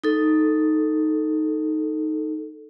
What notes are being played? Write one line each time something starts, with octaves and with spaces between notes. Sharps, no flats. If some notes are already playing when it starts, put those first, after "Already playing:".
D#4 A4